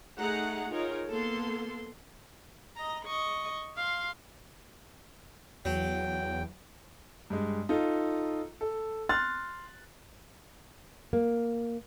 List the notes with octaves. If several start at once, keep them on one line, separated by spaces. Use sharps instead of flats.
A3 D#4 G#4 F#5 A#5
D#4 F4 G#4 A#4 C#5
A#3 B3 A4 C6
D#5 A#5
D#5 C#6
F5 C6
E2 F#3 G5
G2 G#3
D#4 F4 A4
A4
C6 F6 F#6 A6
A#3